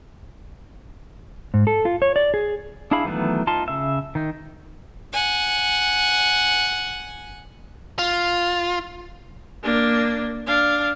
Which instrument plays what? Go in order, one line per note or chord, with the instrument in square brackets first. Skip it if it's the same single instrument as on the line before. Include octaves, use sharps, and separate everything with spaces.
[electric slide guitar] G#2
A4
F4
C#5
D5
G#4
[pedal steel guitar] D4 E4 G#4 F5 B5
D#3 E3 F#3 A3 B3
D#4 F4 A5 C6
C#3 E5
D#3 D#4
[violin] F#5 G#5
[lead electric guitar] F4
[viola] A#3 D4
D4 F5